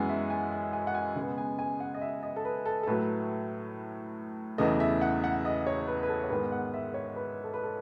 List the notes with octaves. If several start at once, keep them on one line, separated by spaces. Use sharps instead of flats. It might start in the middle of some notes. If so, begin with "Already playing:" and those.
Already playing: F#2 E3 G#3 B3 F#5 G#5
E5
G#5
G#5
G#5
F#5
G#5
C#3 G#3 B3 G#5
G#5
G#5
F#5
D#5
E5
D#5
A4
B4
A4
A4
A2 F#3 A3 B4
E2 C#3 E3 A3 D#5
E5
F#5
F#5
D#5
C#5
B4
B4
A4
C#5
G#2 D#3 G#3 B3 B4
F#5
E5
C#5
B4
A4
B4
A4